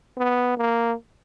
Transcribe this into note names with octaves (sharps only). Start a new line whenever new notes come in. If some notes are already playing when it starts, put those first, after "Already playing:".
B3
A#3